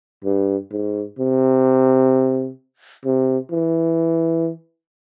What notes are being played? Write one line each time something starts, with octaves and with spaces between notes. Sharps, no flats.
G2
G#2
C3
C3
E3